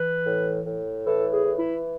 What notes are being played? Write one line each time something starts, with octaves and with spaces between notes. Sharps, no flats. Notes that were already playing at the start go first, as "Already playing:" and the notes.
Already playing: E3 B4
A2
A2
E3 A4
G#4
E3
E4